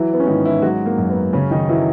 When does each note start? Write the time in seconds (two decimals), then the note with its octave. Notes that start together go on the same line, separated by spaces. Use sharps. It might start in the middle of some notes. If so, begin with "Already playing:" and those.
Already playing: E3 F#3 E4
0.13 B3
0.20 C#4
0.27 G#2 D#3 D#4
0.45 E3 E4
0.62 F#3 G#3 F#4
0.86 A#3
0.98 F#2
1.10 B3
1.33 C#3 C#4
1.51 D#3 D#4
1.68 E3 F#3 E4